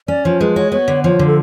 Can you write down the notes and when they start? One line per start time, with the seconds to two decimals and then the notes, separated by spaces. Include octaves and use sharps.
0.08 C#4 D5
0.24 F3 C#5
0.41 G#3 B4
0.56 F#4 C#5
0.72 B3 C#5
0.88 D3
1.04 F3 C#5
1.19 D3
1.27 A4